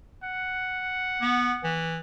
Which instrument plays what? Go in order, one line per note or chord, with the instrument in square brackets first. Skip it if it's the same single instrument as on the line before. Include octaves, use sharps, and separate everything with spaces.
[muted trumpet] F#5
[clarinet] B3
E3